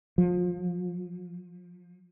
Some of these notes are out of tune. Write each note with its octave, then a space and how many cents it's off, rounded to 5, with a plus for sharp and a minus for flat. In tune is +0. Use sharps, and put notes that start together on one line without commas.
F3 +30